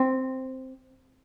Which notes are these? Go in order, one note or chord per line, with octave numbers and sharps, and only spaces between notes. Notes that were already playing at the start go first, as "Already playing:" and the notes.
Already playing: C4